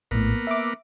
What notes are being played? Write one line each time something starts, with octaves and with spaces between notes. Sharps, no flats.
A#1 A2 A#3 B3
E5 D6